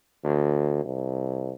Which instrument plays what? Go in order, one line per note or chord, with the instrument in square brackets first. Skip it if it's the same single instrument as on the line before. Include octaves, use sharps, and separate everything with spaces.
[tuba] D2
C2